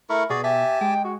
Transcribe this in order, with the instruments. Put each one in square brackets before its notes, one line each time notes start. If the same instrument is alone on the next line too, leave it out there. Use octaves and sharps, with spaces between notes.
[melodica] A3 E4 A#4 [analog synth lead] C#6
[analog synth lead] B2 [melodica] F#4 D5 [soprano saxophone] G#4
[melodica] G4 G#5 A5 [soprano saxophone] E5
[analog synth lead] G#3 [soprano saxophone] G5
[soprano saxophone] F#4